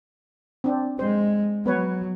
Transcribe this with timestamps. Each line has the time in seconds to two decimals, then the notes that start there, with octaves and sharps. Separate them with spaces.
0.64 C4 D4
0.99 G#3 C5
1.66 F#3 B3 B4 C#5